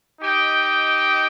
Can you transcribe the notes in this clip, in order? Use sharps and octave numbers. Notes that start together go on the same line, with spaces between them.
D#4 G4 D#5 G5